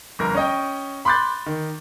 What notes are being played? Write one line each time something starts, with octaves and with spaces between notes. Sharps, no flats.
G1 F2 A#4
C#4 D#5 G5
B5 C6 D6 F#6 G6 A6
D#3